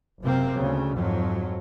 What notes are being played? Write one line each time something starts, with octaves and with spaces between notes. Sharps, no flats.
F#1 C3 A#3 C4
D2 C#3
F2 G#2 F3 F#3